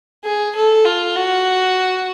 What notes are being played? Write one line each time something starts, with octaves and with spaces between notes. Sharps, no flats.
G#4
A4
F4
F#4